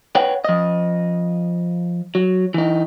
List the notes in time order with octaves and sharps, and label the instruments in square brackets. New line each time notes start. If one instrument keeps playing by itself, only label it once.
[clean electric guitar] B4 C#5 F#5 G5
F3 D#5
F#3
E3 D#4